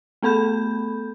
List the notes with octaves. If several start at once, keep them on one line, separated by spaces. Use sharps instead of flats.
A3 B3 A4 B5 G6